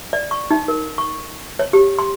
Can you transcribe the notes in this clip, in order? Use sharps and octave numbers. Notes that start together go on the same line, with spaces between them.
D5
C#6
D#4
A#4
C#6
C#5
G4
C6